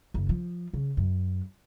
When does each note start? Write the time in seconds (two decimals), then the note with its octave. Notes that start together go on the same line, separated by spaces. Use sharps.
0.14 F#1
0.29 F3
0.74 C#3
0.97 F#2